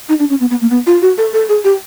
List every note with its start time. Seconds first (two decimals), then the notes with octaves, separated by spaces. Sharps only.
0.09 D#4
0.19 D4
0.30 C#4
0.40 B3
0.50 B3
0.61 A#3
0.71 B3
0.87 F4
1.02 F#4
1.18 A4
1.33 A4
1.49 G#4
1.64 G4